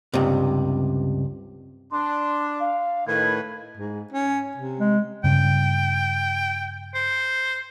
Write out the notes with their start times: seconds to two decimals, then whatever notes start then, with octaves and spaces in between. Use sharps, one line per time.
0.14 C#2 G2 C3
1.91 D4 C6
2.60 F5
3.08 A2 D#3 B4 G#6
3.77 G#2
4.12 C#4
4.57 C3
4.79 G#3
5.24 G2 C#3 G5
6.95 C5